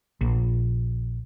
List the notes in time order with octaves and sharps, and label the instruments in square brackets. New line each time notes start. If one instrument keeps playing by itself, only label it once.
[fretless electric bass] A#1